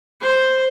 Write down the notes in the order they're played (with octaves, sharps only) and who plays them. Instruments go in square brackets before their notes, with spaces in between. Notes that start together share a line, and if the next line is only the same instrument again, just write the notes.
[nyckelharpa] C5